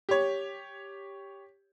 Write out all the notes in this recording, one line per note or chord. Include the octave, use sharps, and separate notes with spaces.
G4 C#5